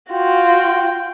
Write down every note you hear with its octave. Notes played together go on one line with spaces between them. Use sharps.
F4 F#4 G5